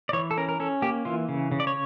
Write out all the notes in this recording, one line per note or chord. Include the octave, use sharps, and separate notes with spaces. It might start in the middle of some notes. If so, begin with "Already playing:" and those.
D5
E3 C#5
A4
C#4 A#4
A#4
C#4 A4
A#3 G4
E3 F4
C#3
C#3
D5
C#5